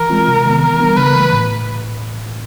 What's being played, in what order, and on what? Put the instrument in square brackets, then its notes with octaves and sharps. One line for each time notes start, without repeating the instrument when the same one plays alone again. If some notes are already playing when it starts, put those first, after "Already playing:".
Already playing: [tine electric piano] E3 [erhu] A#4
[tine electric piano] G#3 C4 F4
C3
D#3 G#3 B3
[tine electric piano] E3 [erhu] A#4
[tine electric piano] G3 B3 D4
[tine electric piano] C#3 [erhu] B4
[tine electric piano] E3 A3
A2